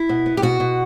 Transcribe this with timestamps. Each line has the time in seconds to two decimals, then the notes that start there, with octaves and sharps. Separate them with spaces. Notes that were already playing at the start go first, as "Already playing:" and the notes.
Already playing: E4
0.09 B2
0.26 B3
0.37 G4
0.42 B2 F#4
0.60 B2